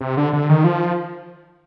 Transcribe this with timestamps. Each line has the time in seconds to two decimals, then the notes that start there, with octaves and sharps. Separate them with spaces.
0.01 C3
0.17 D3
0.33 D3
0.49 D#3
0.64 F3